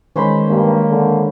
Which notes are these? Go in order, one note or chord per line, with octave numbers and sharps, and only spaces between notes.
D#3 G#3 C#4 C5 B5
G2 A#3
D3